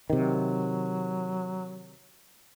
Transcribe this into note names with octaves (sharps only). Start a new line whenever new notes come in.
C3 D#3 F#3